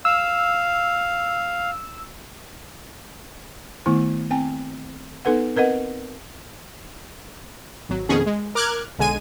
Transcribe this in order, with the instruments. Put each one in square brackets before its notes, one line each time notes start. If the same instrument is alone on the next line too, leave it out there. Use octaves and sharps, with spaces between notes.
[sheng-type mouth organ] F5 [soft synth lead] E6
[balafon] D#3 A3 B3 E4
C4 G5 G#5
B3 D#4 A4 B4 F#5
C4 A#4 B4 D#5 F#5
[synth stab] G#1 F#3
F2 B2 D#3 C#4 G#4
G#3
A#4 D6 F6 F#6 G#6
B1 D3 G#3 G#5 D#7